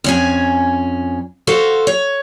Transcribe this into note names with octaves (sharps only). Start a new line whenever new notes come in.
F2 C#4 G#5
F#4 A4 C5 F5
C#5